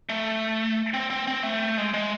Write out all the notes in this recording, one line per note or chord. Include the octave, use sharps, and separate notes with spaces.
A3
C4
C4
C4
A3
G#3
G#3